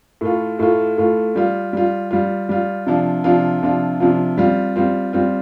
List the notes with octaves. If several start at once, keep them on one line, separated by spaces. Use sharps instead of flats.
A2 A3 F4
A2 A3 F4
A2 A3 F4
G3 F4
G3 F4
G3 F4
G3 F4
C3 F3 D4 F4
C3 F3 D4 F4
C3 F3 D4 F4
C3 F3 D4 F4
G3 C4 F4
G3 C4 F4
G3 C4 F4